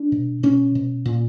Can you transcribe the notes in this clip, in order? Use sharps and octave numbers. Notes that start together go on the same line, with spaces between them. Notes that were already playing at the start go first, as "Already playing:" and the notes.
Already playing: D4
B2
B2 C#4
B2
A#2